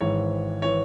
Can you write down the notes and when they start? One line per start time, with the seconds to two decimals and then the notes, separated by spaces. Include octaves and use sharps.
0.01 G#1 G#2 E3 C#5
0.62 E3 C#5